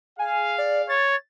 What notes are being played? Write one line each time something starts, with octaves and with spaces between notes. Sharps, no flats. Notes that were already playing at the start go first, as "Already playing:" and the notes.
G#4 F5 G#5
D5
C#5 A6